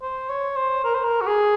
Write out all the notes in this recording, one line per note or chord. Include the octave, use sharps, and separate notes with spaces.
C5
C#5
C5
A#4
C5
A#4
F#4
G#4